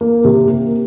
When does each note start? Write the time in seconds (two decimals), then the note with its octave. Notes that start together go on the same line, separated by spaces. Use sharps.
0.01 A#3
0.24 C3
0.47 A#3